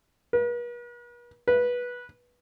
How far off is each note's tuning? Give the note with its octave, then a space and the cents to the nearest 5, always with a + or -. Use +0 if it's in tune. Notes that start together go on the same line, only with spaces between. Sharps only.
B4 -45
B4 -15